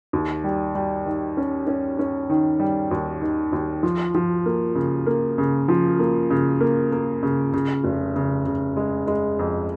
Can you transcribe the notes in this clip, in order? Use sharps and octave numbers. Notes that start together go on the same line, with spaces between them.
D#2
G3
G3
D#3
C#4
C#4
C#4
D#3
G3
D#2
D#3
D#2
F3
F3
A#3
C#3
A#3
C#3
F3
A#3
C#3
A#3
A#3
C#3
C#3
F1
C#3
C#3
G#3
G#3
F2